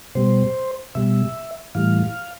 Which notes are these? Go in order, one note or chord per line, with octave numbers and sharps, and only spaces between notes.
B2 G3 C5
B2 G3 E5
A2 E3 G3 F5